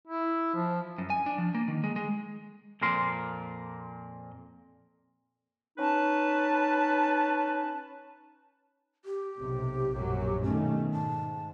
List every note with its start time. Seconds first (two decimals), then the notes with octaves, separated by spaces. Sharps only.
0.07 E4
0.55 F3
0.98 F#2
1.10 G#5
1.26 D4
1.38 F3
1.55 A#3
1.68 D#3
1.84 G#3
1.96 G#3
2.82 F2 A#2 A#4 C6
5.78 C#4 D#4 B4 A5
9.05 G4
9.38 B1 C3
9.93 A#1 F#2 F#3
10.43 B2 D#3 A3 C#4
10.92 G#2 A5